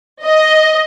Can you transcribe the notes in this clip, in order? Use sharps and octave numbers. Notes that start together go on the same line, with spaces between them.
D#5